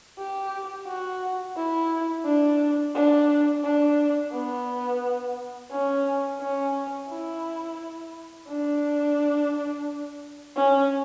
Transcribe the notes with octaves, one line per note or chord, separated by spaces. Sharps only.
G4
F#4
E4
D4
D4
D4
B3
C#4
C#4
E4
D4
C#4